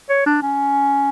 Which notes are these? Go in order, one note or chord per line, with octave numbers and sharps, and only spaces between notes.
C#5
D4
C#4